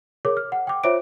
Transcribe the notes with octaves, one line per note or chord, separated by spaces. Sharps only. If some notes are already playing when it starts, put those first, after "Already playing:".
G#4 A#4 C#5 D6
F6
F#5
G5 D6
F4 C5 C#5 E5 D6 D7